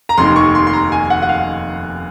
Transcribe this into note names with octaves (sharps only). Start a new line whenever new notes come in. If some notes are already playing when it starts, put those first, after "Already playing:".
A#5
F1 D#2 D#3 C6
C#6
C6
C6
A#5
G#5
F#5
F#5
F5